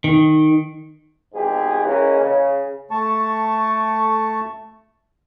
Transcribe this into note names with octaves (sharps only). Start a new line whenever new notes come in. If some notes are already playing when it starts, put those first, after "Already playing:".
D#3
G#1 E2 G#2 G4 G#4
E3 G#3 A#3 C#4
C#3
A3 A5 C#6